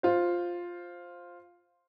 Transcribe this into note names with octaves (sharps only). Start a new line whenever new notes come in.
F4 C5